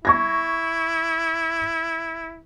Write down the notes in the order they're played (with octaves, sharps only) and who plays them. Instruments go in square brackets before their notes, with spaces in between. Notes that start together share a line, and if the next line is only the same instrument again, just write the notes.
[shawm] E4 [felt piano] C#6 G#6 A#6